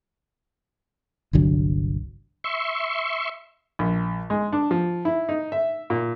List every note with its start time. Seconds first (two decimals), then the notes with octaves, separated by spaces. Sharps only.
1.33 G1 C2 D3 F#3
2.44 E5 C6 C#6
3.79 A#1
4.30 G#3
4.52 D4
4.71 F3
5.05 E4
5.29 D#4
5.52 E5
5.90 A#2